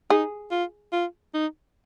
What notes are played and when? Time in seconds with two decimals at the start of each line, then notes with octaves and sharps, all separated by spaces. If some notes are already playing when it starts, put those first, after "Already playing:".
0.10 D#4 G#4
0.51 F4
0.93 F4
1.34 D#4